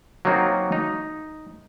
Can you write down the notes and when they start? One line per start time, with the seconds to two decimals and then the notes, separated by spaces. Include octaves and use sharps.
0.25 F#3 A#3 C4 D#4 F4 F#4
0.72 D#4